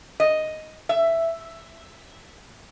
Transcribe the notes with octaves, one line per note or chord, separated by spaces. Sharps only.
D#5
E5